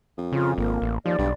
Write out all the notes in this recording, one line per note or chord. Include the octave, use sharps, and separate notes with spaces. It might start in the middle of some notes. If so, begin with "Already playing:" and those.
F2
C#3 F4
G#1 A#3
A1
D#2 F3 D5
B1 G2